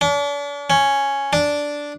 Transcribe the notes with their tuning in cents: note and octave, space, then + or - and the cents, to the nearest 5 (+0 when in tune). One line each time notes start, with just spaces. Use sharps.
D4 -40
C#4 +0
D4 -5